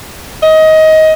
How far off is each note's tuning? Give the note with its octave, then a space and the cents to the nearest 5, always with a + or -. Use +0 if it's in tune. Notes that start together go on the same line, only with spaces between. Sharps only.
D#5 +20